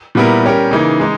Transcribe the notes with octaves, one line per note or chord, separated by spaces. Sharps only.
A#2 G3 B3 E4 A#4
G3 C#4 G4 A#4
C#3 E3 A#3 D#4
G#3 D#4